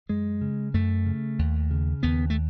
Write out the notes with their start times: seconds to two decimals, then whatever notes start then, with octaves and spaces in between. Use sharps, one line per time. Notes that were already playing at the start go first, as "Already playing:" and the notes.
0.09 F#2 G#3
0.41 C#3
0.74 F#2 A3
1.06 C#3
1.39 D#2
1.71 C#3
2.03 D#2 B3
2.30 A3